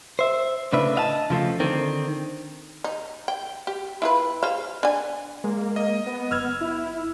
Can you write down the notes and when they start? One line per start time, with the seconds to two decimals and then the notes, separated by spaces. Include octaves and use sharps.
0.19 C5 E5
0.73 A2 C#3 D4 B4 E5
0.95 D#5 F5 A5
1.30 C#3 F3 A3 F4
1.60 D3 D#3 C4
2.84 D#4
3.28 G5
3.67 G4
4.02 E4 F4 B4
4.43 G#4 C5 F5
4.83 D4 G#5
5.44 G#3 A#3
5.76 D#5
6.06 B3
6.31 F#1 E6 F6 G#6
6.61 E4